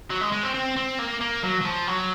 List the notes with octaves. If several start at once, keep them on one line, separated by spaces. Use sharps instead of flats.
F#3
G#3
G#3
C4
C4
C4
A#3
A#3
F#3
F#3
F3
F#3